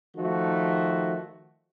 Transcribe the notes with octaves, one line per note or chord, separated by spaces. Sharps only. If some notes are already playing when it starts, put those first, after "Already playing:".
D#3 F3 A3 F#4